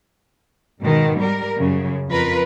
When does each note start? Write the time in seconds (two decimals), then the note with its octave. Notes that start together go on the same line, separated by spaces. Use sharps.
0.80 G#2 B2 D#3
1.21 G3 A#4
1.57 F#2 C#3
2.10 F2 F4 A#4 B4